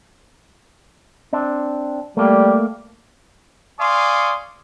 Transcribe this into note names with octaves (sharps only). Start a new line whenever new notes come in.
C4 D4
G3 A3 A#3
D5 F5 G#5 C6 C#6 D#6